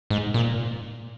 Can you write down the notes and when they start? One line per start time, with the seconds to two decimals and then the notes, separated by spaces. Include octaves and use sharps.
0.10 G#2
0.34 A#2